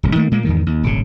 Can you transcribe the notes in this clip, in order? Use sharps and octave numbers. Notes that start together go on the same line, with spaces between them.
D1 C2
D#3 A3 A#3
A#2 G#3 A#3
E2 G#2 D#3
D#2
D#1 G#1 C#3